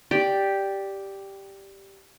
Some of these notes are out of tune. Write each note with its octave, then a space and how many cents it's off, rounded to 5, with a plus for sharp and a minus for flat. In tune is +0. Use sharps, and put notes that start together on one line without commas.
G4 +0 D5 +0